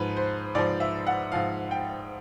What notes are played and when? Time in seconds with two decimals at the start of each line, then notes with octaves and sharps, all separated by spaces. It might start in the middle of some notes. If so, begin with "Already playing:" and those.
Already playing: G#2 F3 B4
0.17 C5
0.55 G#2 F3 D5
0.80 E5
1.07 F#5
1.32 G#2 F3 F5
1.71 G5